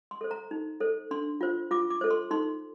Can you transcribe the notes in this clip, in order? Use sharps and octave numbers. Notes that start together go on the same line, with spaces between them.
C6
A4 C5
A#5
D#4
A4 C5
D4 C6
F4 C5
F4 D6
D6
A4 C5
C6
D#4 C6